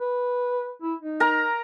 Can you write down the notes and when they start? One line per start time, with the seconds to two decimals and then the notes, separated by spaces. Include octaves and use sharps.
0.01 B4
0.82 E4
1.02 D#4
1.20 A#4 A#5